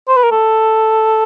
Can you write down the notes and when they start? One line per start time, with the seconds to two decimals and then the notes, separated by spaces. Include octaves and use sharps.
0.08 C5
0.16 B4
0.23 A#4
0.31 A4